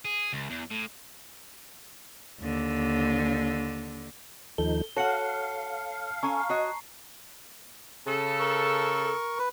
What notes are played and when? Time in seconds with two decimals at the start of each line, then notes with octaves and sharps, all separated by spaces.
0.05 G#4
0.33 C#2
0.50 E2
0.71 A2
2.40 D#2 D3
4.58 D#2 F3 D#4 A4 G7
4.97 F#4 A4 C#5 F5 F#5 A5 C#7
6.23 C#4 A4 G#5 A#5 C#6
6.50 F#4 C#5 D#5 C7
8.07 C#3 A4
8.39 A#4 C#6
9.39 B4